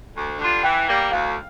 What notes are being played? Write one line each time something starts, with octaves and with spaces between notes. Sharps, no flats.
D2
D3 G3 D4 F4
E3 G5
G3 A#3
D2 F5